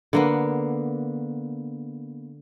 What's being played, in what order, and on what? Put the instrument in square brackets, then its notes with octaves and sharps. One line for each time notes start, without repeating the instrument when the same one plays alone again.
[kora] D3 A#3 B3